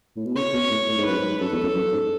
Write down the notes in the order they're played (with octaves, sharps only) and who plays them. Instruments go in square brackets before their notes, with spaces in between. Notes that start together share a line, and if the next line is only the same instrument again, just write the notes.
[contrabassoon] A2
B2
[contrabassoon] C#3 [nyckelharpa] C#5
[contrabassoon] B2
A2
A2
G#2
[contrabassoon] F#2 [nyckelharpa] B4
[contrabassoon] G#2
[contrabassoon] F#2 [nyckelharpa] A4
[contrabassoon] E2
F#2
F#2
G#2